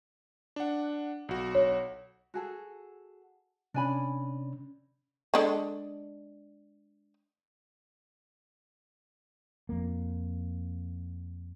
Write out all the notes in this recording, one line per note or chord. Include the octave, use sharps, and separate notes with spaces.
D4 F#5
B1 F#4
C#5
F#4 G#4 A4
C3 C#4 D4 G#5 B5
G#3 D4 A4
F2 A#3